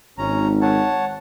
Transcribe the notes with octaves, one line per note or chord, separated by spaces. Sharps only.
G#1 C#4 A#5
C#5 F#5 A5